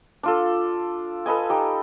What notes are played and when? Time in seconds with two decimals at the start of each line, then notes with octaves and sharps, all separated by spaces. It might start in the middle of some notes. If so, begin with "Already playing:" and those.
0.23 D4 F4 A4
1.26 A4 B4 D#5 G#5
1.50 D#4 G4